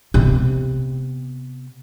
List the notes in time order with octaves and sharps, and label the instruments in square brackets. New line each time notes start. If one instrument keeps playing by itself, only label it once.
[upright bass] C3 B3